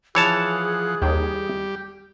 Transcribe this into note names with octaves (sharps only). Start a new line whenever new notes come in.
E3 F3 G#4 C#5 F#5 A5
D#2 G3 G4